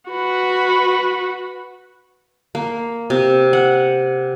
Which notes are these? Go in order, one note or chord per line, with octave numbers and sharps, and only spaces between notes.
F#4 B4
A#3
C3
F#5